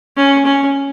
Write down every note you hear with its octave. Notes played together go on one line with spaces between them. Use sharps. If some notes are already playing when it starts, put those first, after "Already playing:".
C#4
C#4